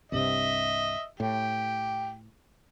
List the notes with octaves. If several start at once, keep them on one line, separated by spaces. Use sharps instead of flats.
C2 G2 C3 D#5 E5
A2 G4